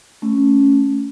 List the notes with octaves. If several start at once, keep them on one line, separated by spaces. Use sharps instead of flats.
A3 C#4